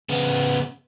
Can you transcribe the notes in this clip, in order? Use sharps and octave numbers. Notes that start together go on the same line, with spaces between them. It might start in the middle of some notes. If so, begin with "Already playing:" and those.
C#3 B3